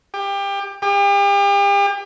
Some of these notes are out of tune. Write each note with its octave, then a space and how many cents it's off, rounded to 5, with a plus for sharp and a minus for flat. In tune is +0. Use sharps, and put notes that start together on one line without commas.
G4 +25
G4 +40